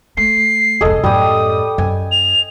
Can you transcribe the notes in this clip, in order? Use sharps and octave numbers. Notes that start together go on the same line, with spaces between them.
A3 C7
E1 G2 G#4 A4 D#5
F#2 A2 G3 G4 D#6
F#2 G#5
F7